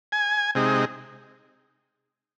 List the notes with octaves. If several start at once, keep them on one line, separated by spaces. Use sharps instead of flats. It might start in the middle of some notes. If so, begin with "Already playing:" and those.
G#5
C3 G#3 D#4